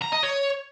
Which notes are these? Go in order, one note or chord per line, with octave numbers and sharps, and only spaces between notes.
A#5
D#5
C#5